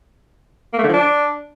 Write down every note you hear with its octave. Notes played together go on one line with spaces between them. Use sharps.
A#3
A3
D3
F3
D4